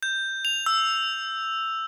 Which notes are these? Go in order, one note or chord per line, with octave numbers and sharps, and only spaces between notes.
G6
F7
E6